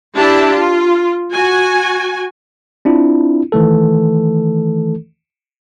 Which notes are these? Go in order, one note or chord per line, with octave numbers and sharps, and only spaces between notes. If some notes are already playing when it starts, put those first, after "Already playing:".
D4 E4 G4 A5
F4
F#4 G#5
C4 D4 E4 F4
D#3 E3 A3 A4